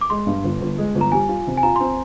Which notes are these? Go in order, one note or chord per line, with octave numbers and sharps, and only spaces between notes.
D6
G#3 C6
G2
G1
G1
G#3
G1
A#5
G3 G#5
F4
C3
G#5
F4 A#5
C4 C6